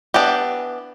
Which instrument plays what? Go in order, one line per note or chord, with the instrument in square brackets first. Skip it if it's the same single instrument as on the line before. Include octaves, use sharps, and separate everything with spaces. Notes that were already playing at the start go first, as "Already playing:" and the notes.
[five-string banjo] E3 B3 D4 G4